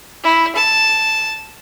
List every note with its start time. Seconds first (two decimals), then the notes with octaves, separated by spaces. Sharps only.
0.24 E4
0.55 A5